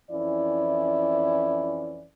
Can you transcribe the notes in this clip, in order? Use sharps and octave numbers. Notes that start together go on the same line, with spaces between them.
F2 E3 C#4 E4 D5